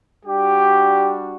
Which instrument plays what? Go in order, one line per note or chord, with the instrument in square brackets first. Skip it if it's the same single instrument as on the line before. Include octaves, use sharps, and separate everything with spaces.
[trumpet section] G3 D4 F#4 G4